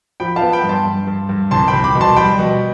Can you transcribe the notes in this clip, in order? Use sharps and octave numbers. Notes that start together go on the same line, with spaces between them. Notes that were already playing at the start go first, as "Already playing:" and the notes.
F3 G5 B5
F5 A5
B3
G5 B5
G2
A5 C6
G2
G2
G2
C2 A5 C6
G5 B5
C2
B5 D6
B2
A5 C6
G3 G5 B5
B2